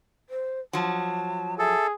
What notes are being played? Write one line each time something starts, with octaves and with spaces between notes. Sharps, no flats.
C5
F3 F#3 A5
G#4 A4 E5